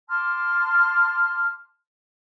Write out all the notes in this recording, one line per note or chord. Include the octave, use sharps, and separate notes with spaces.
A5 C6 D6 F6